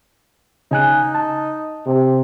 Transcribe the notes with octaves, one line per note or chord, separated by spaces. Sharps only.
C#3 D#4 G#5 F#6
A5
C3